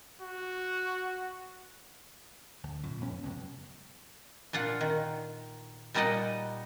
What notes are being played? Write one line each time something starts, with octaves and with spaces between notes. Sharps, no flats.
F#4
D2
F#2 A#2
F2 B2 B3 C#4
C#2 F#2 C3
A#2 D4 F4 F#5
D#3
A#2 G3 D#4 D5 D#5 F#5